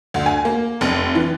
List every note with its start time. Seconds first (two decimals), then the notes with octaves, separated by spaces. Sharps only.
0.14 D2
0.26 G#5
0.45 A#3
0.81 F1
1.15 E3